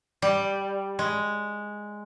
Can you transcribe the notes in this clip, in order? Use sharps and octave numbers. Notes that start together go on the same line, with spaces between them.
G3
G#3